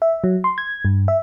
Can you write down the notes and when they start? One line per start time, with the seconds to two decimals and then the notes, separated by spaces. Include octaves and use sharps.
0.02 E5
0.24 F#3
0.44 C6
0.58 G#6
0.85 G2
1.08 E5